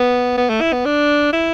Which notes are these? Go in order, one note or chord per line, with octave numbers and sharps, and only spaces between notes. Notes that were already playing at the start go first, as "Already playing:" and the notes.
Already playing: B3
B3
A3
E4
B3
D4
E4